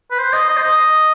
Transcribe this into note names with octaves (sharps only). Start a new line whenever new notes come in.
B4
C5
D#5
D#5
C5
D#5